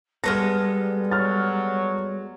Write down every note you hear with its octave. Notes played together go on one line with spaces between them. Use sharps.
G3 G#3 B3 A4 F6 A#6
F#3 F6 A6